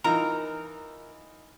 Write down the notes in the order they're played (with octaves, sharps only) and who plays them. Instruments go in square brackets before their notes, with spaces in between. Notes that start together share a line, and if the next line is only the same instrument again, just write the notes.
[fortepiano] E3 D#4 F4 [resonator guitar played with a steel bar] A#4 A#5